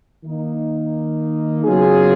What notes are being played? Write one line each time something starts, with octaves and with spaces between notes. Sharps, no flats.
D#3 A#3 D#4
C#3 F#3 B3 F4 G#4